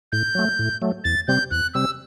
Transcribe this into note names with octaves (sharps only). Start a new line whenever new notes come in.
A2 G6
F#3 A3
A2
F#3 A3
E2 A6
C3 G3 C4 G6
E2 F#6
C3 G3 C4 E6